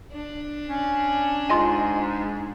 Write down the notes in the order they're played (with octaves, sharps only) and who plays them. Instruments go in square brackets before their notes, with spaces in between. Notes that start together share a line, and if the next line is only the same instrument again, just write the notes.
[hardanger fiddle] D4
[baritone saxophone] C#4
[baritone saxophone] G#2 [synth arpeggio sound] F4 D#5 G#5